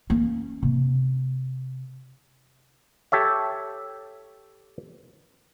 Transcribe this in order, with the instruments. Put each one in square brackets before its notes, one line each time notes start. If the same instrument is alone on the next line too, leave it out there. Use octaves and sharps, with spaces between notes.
[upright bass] A#3 C#4
C3
[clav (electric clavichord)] G4 A4 C#5 E5